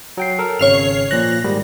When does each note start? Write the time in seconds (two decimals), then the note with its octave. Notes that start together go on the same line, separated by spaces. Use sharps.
0.17 F#3 G5 C7
0.39 A4 A#4
0.59 G#1 C#3 C#5 F6 C7 F7
1.11 A#2 F3 F#6 A#6
1.44 G#2 D#3 G3